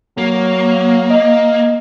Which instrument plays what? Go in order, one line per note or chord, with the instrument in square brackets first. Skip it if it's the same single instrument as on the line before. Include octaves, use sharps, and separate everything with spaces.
[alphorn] F#3 [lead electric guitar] A#3
[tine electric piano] D#5